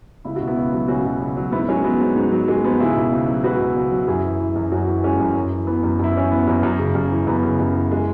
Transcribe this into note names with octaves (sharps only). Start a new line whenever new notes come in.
C#2 E4
B2 F#4
B3 E4
C#2
F#3
C#2 C#4 F#4
B2
C#2
F#3
G#2 B3 E4
F#3 G#3 C#4
F#3 B3
G#2
G#2
F#3
F#3 G#3
G#2 B3
C#2 E4 G#4
B2
C#2
F#3
C#2 F#4 B4
B2
C#2
F#3
F#2 E4 G#4
E3
E3
F#2
F#2 C#4 F#4
E3
E3 G#3 C#4
F#2
F#2
E3
E3 B3
F#2
F#2 E4
E3 C#4
E3 B3
F#2 B3
F#2
C#3
F#2
E3
F#2 B3
C#3
F#2
E3
G#3